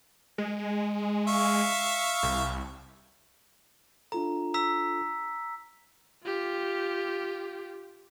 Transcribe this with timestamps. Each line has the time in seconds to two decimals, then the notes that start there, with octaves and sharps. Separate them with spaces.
0.38 G#3
1.28 E5 F5 C#6
2.23 C2
4.12 D4 F4 A4 A#5
4.54 A#5 E6 B6
6.24 F4 G4